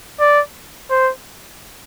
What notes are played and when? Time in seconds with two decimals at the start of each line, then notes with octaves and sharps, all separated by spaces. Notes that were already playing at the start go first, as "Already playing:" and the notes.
0.20 D5
0.90 C5